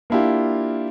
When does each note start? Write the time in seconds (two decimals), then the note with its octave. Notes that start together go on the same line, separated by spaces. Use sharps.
0.10 A#3 D4 E4 F4 G4